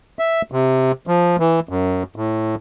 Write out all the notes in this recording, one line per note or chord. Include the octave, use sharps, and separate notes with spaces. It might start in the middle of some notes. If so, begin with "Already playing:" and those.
E5
C3
F3
E3
F#2
A2